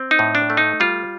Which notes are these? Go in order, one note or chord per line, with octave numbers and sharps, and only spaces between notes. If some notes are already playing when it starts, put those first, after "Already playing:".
Already playing: C4
D#4
A2
D4
A3
D#4
G3 F4